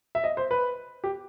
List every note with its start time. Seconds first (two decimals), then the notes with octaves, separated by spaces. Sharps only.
0.15 E5
0.24 D#5
0.37 C5
0.51 B4
1.04 G4